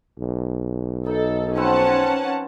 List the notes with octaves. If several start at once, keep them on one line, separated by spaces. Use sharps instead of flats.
B1
D#4 A4
F3 C4 C#4 B4 F#5 A5